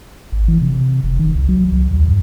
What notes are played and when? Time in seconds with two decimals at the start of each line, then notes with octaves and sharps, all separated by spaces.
0.32 G#1
0.48 E3
0.62 C3
1.03 F1
1.19 D#3
1.35 C2
1.49 F#3
1.72 C2
1.91 D#2
2.08 G2